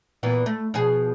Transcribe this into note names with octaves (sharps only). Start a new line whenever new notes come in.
A#2 E3 B3
A3
B2 F3 G#4